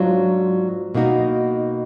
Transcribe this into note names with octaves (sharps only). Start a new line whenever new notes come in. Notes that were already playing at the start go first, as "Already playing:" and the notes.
Already playing: G#2 F#3 D4 F4
B2 A#3 D#4 F#4